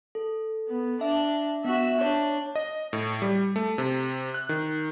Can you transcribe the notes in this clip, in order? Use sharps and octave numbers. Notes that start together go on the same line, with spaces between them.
A4
B3
D4 E5
B3 F#4 E5
D4 C#5
D#5
A2
G3
A3
C3
F#6
D#3